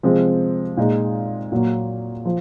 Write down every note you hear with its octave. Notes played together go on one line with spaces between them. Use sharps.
C3 F3 G#3 C4
A#2 G#3 D#4
A#2 F#3 A#3
F3